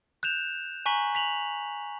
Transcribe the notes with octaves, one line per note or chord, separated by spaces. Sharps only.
F#6 G6 E7 F7
G#5 A#5 C#6 F#6 B6 F#7
B6 F7 F#7